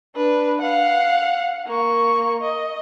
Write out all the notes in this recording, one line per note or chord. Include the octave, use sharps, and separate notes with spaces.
D4 B4
F5 F#5
A#3 C#6
D#5